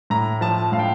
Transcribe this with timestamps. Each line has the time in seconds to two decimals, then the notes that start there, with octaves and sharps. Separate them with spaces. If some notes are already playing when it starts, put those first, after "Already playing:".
0.10 A2 A#5
0.41 F3 A5
0.72 A2 F5
0.79 G5